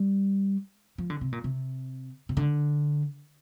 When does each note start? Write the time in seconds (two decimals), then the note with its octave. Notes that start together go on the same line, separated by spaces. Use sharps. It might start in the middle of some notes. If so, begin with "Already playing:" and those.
Already playing: G3
0.98 F3
1.10 D3
1.21 C3
1.32 A#2
1.44 C3
2.29 C3
2.37 D3